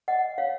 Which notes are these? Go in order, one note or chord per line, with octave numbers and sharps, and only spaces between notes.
D#5 F#5
C#5 F5